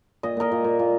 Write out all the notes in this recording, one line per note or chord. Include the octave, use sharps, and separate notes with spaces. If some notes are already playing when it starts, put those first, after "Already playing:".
A#2 D#5
A#2 A#4 D#5
A#2
A#2
A#2